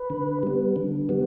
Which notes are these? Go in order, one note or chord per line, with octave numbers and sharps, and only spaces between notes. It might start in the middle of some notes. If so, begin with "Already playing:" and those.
Already playing: B4
D3
G3 B3
D3
G3 B3